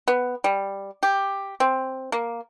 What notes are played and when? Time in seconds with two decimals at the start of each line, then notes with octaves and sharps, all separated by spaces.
0.08 B3
0.44 G3
1.03 G4
1.60 C4
2.12 A#3